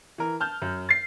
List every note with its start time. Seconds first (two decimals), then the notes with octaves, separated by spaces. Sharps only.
0.18 E3 A#4
0.40 A5 F6 G6
0.62 F#2
0.89 A6 C7